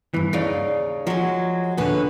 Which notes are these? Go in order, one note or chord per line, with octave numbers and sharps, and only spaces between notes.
G2 E3
D#2 C#3 D#4 D5 F5
F3 F#3 G#3
D#2 A#2 D3 B3 C#4 B4